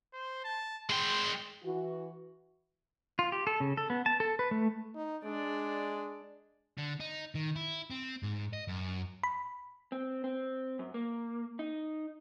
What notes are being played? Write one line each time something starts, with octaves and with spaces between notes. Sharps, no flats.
C5
A5
G#3 G5 C6
E3 F#4
F4
G4
A4
C#3
A4
B3
A5
A4
B4
A3
D#4
G#3 D4 D5
D3
D#4
D#3
E4
C4
G#2
D#5
F#2
B5
C4
C4
F#2
A#3
D#4